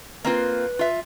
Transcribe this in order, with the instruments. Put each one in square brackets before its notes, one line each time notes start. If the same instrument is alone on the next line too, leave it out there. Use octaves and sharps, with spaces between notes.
[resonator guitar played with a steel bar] A#3 C4 F4 [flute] B4
[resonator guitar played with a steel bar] F4 E5